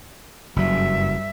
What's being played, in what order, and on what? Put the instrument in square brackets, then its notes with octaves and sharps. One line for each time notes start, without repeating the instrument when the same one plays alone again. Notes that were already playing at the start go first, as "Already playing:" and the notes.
[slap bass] F#1 F#3 [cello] G2 E5